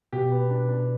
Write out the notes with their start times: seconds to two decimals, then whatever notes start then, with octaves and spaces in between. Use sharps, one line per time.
0.13 B2 G4
0.32 B3
0.50 D4
0.69 D4